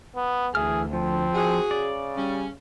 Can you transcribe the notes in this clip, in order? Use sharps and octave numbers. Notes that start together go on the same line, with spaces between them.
B3
D2 E3 G#4 E5 F6
F3 C4
F#4 G#4
C#3 D5
G3 C#4